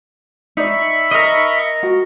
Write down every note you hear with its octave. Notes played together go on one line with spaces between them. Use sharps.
D#4 D5 E5 B5 C#6
A#4 D#5
F#4